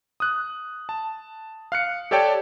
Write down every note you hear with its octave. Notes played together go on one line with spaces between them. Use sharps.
D#6 F#6
A5
F5 F#6 C#7
G4 A4 C#5 D5 G5 A5